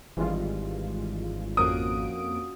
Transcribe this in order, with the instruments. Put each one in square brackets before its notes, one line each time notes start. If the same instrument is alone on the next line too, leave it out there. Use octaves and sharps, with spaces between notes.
[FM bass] G#1 [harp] G2 [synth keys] E3 G#3 F4
[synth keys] F2 A#3 D7 [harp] C#4 F4 F#4 [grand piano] D#6